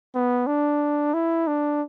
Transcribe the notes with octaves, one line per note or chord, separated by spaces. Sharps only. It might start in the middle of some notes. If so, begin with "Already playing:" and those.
B3
D4
E4
D4